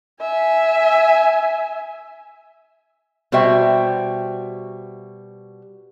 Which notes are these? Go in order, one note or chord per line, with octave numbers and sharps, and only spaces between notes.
E5 G#5
B2 G3 F#4 C5 E5 G5